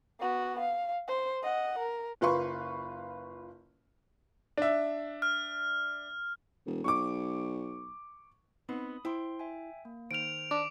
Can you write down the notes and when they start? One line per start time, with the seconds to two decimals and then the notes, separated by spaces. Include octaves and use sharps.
0.20 B3 F#4
0.59 F5
1.08 C5
1.43 D#5 F#5
1.78 A#4
2.21 F#1 F4 B4 C6 C#6
4.57 D4 E5
5.22 F6
6.66 E1
6.84 B1 C#6 D6
8.69 B3 C4 D#4 B5 D#6
9.05 E4 C5 G5 C6
9.39 E5 G5 G#5
9.85 A#3
10.11 D#3 C5 F6 D7 F7
10.51 D4 D6